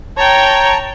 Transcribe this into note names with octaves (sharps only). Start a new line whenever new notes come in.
C#5 G5 A5 A#5